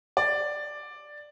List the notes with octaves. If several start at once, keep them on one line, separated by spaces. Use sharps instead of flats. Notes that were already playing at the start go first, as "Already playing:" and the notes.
D5